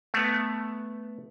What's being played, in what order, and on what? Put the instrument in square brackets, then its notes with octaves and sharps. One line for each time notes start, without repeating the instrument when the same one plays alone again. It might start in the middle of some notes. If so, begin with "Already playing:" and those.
[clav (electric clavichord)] A3 B3